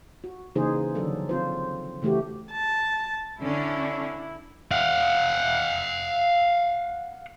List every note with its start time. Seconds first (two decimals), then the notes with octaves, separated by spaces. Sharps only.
0.24 F#4
0.55 C#3 E3 A#3 D#4 G#4 C5
0.95 D3 D#3 F3 F#3 D4 A4
1.29 C4 F4 C5
2.02 C#3 E3 A3 F#4 G4
2.51 A5
3.42 D3 C#4 D4 E4
4.71 F5 F#5